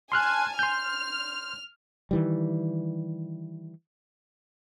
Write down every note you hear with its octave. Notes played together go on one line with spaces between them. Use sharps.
G#5 A5 C6 F6 F#6
C6 F6 G6
D#3 E3 G3